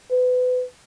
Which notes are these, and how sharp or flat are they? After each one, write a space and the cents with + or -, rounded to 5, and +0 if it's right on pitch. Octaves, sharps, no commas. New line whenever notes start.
B4 +30